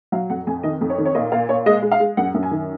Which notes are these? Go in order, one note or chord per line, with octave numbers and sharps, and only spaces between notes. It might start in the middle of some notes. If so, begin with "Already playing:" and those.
F#3 F5
F2 F#5
F2 G#5
D#3 D#5
F2
C#5
D#3
C#5
A#2 D#5
A#2 F5
A#2 C#5
G#3 D#5
G#3
F5
G#3
F#2 F#5
F#2
G#5
D#3